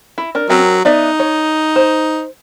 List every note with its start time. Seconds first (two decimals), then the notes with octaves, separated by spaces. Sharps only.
0.18 E4
0.35 D4 A#4
0.50 F#3 C4 C#4 A#4
0.85 B3 D#4 D5 E5
1.20 C#5
1.76 C5